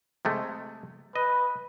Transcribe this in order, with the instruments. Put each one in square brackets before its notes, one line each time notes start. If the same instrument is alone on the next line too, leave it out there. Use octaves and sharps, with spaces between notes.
[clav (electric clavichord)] C3 G#3 A3
[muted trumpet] B4 [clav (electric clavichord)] D#5